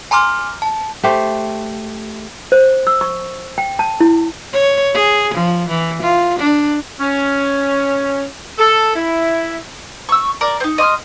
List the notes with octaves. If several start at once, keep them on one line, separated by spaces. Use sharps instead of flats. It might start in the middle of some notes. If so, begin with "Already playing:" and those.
G#5 A#5 C6 D6 F6
A5
A3 G4 C5
C5
E6
C#6
G5
A5
E4
C#5
G#4
F3
E3
F4
D4
C#4
A4
E4
C#6 E6
A#4 D5
C4 D#4
D#5 C6 D#6 F6